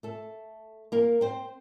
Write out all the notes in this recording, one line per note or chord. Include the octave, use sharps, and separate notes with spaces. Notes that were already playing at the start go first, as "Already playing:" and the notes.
A3 A4
A#3 A#4
C4 C5